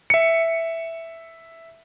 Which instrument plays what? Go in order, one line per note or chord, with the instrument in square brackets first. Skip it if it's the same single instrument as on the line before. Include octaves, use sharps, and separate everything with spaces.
[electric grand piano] E5 C#7